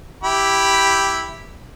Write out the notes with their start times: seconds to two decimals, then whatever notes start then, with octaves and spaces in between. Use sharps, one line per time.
0.24 E4 G4 B5